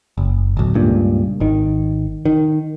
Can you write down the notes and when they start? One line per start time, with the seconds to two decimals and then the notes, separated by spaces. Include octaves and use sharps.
0.18 F#1
0.57 D1 B1
0.75 C#2 G2 A#2
1.40 G#1 D#3
2.25 D#3